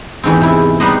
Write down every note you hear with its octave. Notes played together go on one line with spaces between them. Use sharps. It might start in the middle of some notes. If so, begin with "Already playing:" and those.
E2 G#2 C4
C3 E4
G3 B3 D#4 B4 C5 D#5